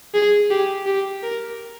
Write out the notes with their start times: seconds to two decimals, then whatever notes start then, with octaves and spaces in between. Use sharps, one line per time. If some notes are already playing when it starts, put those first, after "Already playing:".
0.14 G#4
0.50 G4
0.86 G4
1.23 A#4